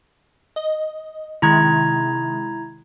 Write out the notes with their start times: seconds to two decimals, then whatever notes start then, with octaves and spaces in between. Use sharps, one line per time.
0.56 D#5
1.42 C3 D#3 G#3 E4 A#5 G#6